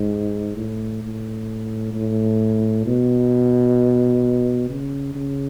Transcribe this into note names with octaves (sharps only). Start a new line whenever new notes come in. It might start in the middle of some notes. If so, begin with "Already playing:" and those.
Already playing: G#2
A2
A2
A2
B2
C#3
C#3